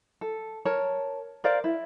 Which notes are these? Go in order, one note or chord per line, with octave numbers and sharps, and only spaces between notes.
A4
A#4 C#5 A5
A#4 C5 D5 F5
E4